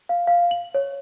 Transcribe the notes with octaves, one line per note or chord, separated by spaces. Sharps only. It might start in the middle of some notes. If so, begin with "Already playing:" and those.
F5
F5
F#7
C#5